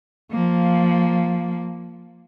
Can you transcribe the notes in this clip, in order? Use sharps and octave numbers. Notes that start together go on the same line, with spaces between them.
F3 A#3